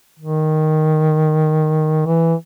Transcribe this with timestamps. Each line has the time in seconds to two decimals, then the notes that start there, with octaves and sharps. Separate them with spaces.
0.19 D#3
2.06 E3